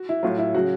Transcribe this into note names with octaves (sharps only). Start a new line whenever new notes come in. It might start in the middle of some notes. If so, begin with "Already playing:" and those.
Already playing: F#4
E4
A2 F#3 F4
E4
C#3 F#3 F#4